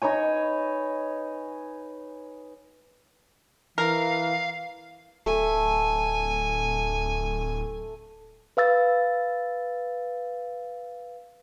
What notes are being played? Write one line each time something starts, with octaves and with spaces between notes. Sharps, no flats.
D#4 B4 C#5 G#5
E3 A#4 F5
D1 A3 G#5
B4 F5 E6 A6